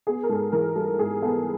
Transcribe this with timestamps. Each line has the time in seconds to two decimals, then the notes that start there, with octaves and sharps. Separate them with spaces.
0.07 B3 G#4
0.23 A#4
0.29 G#2 A4
0.52 E3 A#4
0.75 G3 A4
0.99 G#2 G#4
1.22 B3 A4